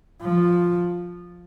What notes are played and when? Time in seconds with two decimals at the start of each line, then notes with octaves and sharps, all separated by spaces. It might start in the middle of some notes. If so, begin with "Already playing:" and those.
0.22 F3